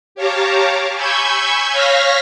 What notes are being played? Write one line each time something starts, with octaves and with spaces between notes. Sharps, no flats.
G4 C#5 F5 A5 A#5 D6
G#5 B5 C#6 E6 G6 G#6
C#5 F5 C#6 F6 A#6 B6